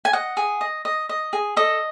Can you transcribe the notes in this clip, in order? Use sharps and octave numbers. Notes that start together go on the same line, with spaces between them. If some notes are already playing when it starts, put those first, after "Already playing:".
G#5
D#5 F#5
G#4
D#5
D#5
D#5
G#4
A4 D#5